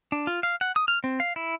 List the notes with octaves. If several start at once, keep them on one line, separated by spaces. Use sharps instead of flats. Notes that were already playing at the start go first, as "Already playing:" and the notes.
D4
F4
F5
F#5
D#6
F6
C4
F5
E4